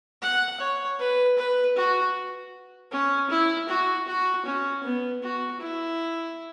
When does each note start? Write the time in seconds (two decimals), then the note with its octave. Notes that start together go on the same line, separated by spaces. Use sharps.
0.22 F#5
0.60 C#5
0.99 B4
1.37 B4
1.76 F#4
2.92 C#4
3.30 E4
3.68 F#4
4.07 F#4
4.46 C#4
4.84 B3
5.23 F#4
5.61 E4